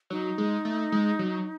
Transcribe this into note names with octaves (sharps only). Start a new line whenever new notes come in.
F#3 D#4
G#3
A3
G#3
F#3